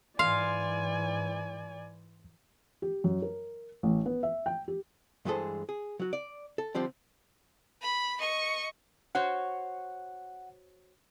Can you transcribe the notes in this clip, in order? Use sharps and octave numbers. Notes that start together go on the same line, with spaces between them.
G#2 E3 D5 F5 G#5 C6
G4
F#2
A#4
A1
B3
E5
G5
G4
G2 E3 G#3 G#4 A4 C5
G#4
F#3 F#4
D5
A4
D3 F3 G3 C4
B5
D#5 C#6
F#4 C5 C#5 F#5